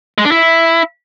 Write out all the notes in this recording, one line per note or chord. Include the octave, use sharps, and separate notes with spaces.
G#3
D4
E4